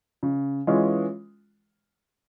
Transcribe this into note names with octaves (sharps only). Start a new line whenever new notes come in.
C#3
E3 G#3 C#4 F4